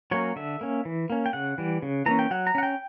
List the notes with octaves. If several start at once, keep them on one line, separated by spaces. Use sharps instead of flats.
F#3 A#3 C#4 C#5
D3 E5
A#3 C#4
E3
A#3 C#4
G5
C#3 F#5
E3 G3
C#3
E3 A#3 C#4 A#5
G5
F#3 F#5
A#5
C#4 F#5
G5